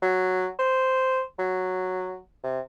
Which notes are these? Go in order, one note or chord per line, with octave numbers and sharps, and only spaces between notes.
F#3
C5
F#3
C3